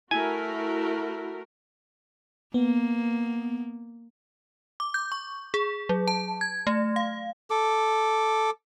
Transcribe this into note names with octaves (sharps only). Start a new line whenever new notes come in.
A3 E4 F#4 A#4 G#5
A#3 B3
D6
G6
C#6
G#4
F#3
A5
G#6
A3
F5
A4 D6